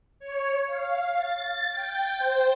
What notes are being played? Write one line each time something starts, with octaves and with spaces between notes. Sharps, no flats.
C#5
F5
A6
G5
C5